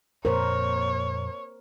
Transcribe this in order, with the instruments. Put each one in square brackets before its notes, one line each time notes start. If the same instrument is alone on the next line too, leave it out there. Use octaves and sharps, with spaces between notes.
[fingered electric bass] F2 A#2 [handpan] A#4 C5 [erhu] C#5